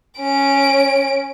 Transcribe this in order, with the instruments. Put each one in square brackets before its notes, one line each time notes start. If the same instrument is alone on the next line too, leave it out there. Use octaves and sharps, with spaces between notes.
[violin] C#4 D7